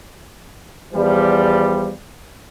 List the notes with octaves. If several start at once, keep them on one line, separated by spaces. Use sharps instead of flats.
E2 F3 G3